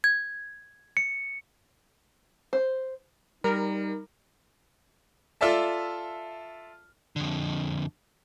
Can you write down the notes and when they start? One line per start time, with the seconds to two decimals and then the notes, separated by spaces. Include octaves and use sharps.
0.04 G#6
0.97 C#7
2.53 C5
3.44 G3 D#4 A#4
5.41 F4 A4 D5 E5 A5
7.16 F2 D3